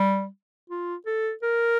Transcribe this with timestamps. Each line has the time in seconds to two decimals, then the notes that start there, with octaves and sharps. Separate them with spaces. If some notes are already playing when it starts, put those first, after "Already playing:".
Already playing: G3
0.70 F4
1.06 A4
1.43 A#4